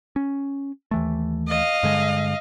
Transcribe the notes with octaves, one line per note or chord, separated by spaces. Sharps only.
C#4
D#2 E3 A3
D#5 F5
G2 D3 G#3